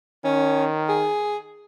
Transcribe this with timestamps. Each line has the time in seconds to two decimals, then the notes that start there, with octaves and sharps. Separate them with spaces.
0.24 D#3 C#4
0.88 G#4